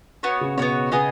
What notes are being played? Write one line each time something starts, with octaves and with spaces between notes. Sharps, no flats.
B3 F#4 C#5
C#3
B2 B3 F#4 C#5
C#3 B3 G#4 D#5 G#5